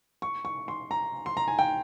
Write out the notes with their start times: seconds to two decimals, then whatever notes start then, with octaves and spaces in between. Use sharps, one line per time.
0.22 C#6
0.45 C#6
0.68 C6
0.91 A#5
1.26 C6
1.37 A#5
1.48 G#5
1.59 G5